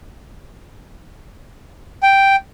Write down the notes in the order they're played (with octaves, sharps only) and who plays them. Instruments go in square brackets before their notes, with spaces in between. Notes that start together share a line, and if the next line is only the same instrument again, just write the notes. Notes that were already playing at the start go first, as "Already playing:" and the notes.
[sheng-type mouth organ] G5